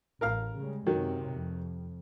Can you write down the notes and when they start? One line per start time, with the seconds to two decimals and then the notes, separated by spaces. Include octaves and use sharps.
0.21 A1 A#4 F5 F6
0.56 C#3 G3 G#3
0.87 F#2 C3 D#3 F#3
1.32 F2